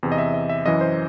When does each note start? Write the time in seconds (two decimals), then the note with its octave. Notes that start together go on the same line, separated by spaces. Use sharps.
0.03 E2 C3 E3
0.12 D#5
0.18 E5
0.34 D#5
0.49 E5
0.66 F#2 E3 D#5
0.81 C5